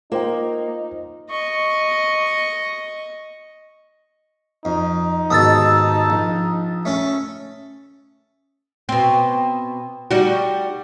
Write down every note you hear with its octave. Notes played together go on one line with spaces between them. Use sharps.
A#3 D#4 F4 C5 G5
D#5 C#6
F2 D#4
D#2 G#2 B2 A5 D#6 E6 A6
A#1
A3 C#4 A4
B2 C4
G3 D#4 F#4